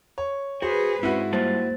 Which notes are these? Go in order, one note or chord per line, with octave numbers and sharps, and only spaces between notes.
C#5
F#4 G#4 B4 C5
G#2 C4 C#4 E4 F#4
G3 A#3 F4 C5 A5 A6